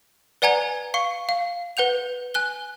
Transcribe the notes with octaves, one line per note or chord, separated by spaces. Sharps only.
B4 D5 F#5 G#5 A#5 G#6
F5 C#6 C#7
F5
B4 F#5 G6 F7
G#5 F#6 G7